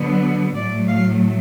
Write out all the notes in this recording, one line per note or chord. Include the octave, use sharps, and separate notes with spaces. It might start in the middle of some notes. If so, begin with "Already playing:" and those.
Already playing: D3 F#3 B3
A2 F#3 A3 D5
F5